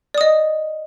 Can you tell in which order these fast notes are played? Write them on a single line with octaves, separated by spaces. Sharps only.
D5 D#6 D#5